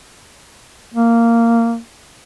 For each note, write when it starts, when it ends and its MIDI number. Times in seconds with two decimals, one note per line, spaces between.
0.94 1.78 58